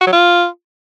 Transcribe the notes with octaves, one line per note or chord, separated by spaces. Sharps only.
F#4
F#3
F4